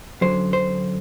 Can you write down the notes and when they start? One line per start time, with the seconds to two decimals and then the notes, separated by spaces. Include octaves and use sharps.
0.21 F#2 D3 F#3 C5
0.53 C5